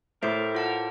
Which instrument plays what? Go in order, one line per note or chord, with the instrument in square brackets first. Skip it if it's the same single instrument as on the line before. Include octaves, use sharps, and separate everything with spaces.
[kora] A2 C5 [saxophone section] G3 G4 A#4 [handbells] E5
[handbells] F4 F#5 A5